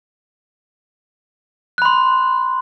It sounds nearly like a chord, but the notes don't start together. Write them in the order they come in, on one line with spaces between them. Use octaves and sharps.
F#6 B5 C6